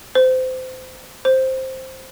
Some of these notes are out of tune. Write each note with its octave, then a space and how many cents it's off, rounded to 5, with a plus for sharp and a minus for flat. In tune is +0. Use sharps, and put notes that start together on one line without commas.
C5 -25
C5 +5